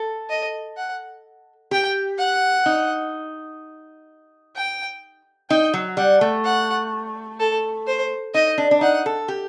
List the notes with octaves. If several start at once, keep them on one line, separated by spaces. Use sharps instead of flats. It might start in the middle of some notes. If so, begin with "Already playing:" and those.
Already playing: A4
D#5
F#5
G4 G5
F#5
D#4
G5
D#4 G5
F#3
G3 F#5
A3
F#5
A4
C5
D#4 D#5
D4
D4
D#4 F#5
A4
G4